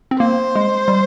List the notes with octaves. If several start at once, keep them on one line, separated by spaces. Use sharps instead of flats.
C4
A#3 C5
G#3
G3